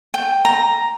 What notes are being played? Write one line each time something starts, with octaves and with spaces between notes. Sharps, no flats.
G5
A#5